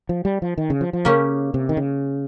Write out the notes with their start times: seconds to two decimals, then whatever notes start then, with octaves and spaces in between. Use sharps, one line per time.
0.09 F3
0.25 G3
0.42 F3
0.58 D#3
0.70 C#3
0.81 F3
0.93 F3
1.05 C#3 A#3 C#4 G4
1.54 C3
1.69 D#3
1.77 C#3